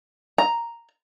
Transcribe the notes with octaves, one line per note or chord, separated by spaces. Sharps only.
A#5